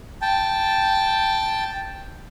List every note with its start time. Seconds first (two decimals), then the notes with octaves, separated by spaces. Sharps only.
0.22 G5 A5